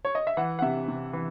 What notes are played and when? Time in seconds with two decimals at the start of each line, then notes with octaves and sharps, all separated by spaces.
0.05 C#5
0.15 D#5
0.27 E5
0.37 E3 F#5
0.59 F#5
0.62 C3 E5
0.88 C3
1.13 E3